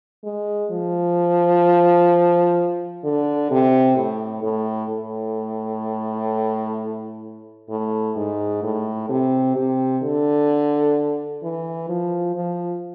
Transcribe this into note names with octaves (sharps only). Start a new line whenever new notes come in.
G#3
F3
D3
C3
A2
A2
A2
A2
G#2
A2
C3
C3
D3
E3
F3
F3